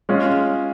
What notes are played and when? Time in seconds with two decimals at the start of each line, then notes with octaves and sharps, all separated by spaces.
0.09 G#3 C#4 F4